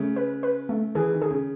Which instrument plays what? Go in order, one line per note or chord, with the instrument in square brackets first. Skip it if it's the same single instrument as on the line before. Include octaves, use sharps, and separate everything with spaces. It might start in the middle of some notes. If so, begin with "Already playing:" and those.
Already playing: [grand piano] C#3 [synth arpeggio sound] A3
[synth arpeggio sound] B4
B4
A3
[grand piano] E3 [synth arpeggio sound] G#4
[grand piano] D#3
[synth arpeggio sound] G#4
[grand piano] C#3